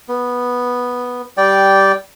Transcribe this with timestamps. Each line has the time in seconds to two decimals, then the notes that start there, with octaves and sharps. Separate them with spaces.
0.08 B3
1.37 G3 D5 G5